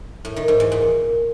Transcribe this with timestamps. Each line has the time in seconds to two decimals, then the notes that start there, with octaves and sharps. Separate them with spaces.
0.25 A2
0.36 D#3
0.48 G#2
0.60 E2
0.72 A#2